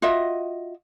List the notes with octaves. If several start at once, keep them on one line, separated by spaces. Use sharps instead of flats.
F4 F#4 D#5 E5